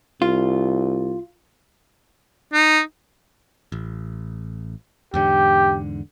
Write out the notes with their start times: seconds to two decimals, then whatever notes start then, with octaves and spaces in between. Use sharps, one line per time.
0.22 C2 F4
2.53 D#4
3.72 A1
5.14 E2 G#2 D3 G4